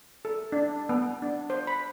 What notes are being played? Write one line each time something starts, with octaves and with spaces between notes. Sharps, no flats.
A4
D4
B3
D4
C5
B5